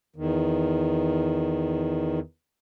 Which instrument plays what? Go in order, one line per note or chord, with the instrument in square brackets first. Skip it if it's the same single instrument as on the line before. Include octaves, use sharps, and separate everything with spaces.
[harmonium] E2 D#3